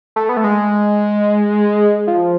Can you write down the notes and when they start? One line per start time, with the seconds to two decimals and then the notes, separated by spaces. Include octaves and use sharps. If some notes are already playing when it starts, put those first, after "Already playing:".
0.16 A3
0.29 B3
0.37 A3
0.44 G#3
2.07 F3